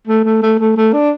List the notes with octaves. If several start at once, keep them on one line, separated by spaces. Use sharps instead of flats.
A3
A3
A3
A3
A3
D4